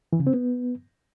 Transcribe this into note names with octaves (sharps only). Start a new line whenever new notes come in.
E3
C#3
C4
B3